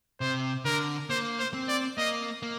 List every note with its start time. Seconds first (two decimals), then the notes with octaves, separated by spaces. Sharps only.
0.21 C3 C5
0.65 D3 A#4
1.10 A#3 C5
1.39 C5
1.54 C4
1.69 D5
1.98 A#3 D#5
2.43 A#3